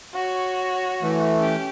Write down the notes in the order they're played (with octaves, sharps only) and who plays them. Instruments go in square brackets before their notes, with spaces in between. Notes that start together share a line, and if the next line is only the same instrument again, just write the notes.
[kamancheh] F#4 C#5
[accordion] E3 A3
[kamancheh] C#4 G4